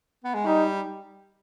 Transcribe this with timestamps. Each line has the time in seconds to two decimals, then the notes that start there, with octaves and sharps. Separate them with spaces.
0.24 B3
0.34 G#3
0.46 G3 D#4